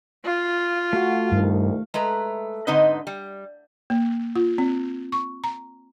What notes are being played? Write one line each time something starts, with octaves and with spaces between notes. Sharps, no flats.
F4
A3 F#4 F5
C2 G2 D#3
G#3 A3 B4 A#5
G#2 D3 C4 D#4 B4 D#5
G3
A#3
F4
C4
C#6
A#5